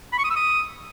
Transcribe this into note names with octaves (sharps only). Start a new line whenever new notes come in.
B5
C#6
D#6
E6
D#6